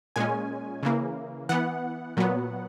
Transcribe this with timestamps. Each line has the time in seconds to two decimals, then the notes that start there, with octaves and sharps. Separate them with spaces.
0.16 A#2 G#3 C#4 G#5
0.83 C#3 E3 A#3
1.49 E3 B3 F#5
2.17 A#2 F#3 B3